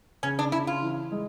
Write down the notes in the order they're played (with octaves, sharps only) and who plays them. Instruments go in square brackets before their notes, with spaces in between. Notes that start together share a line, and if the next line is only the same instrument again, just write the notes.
[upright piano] C#3 [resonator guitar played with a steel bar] C#4
[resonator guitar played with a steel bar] D4
[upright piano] C#3 [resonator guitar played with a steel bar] E4
[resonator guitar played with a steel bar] F4
[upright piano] E3
G#3